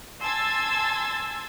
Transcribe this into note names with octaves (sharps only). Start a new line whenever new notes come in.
G#5 A5 C6 E6 G#6 A6